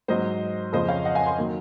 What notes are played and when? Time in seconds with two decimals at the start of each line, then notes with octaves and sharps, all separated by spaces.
0.08 G#2 F#3 C5 D#5
0.73 F2 C#3 F3 C5 D#5
0.89 C#5 F5
1.05 D#5 F#5
1.15 F5 G#5
1.26 G#5 C6
1.38 D#3 F#3